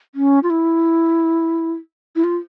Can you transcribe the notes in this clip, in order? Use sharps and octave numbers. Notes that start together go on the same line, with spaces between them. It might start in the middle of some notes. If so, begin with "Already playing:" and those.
C#4
F4
E4
E4
F4